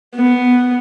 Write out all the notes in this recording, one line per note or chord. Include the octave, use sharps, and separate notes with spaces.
B3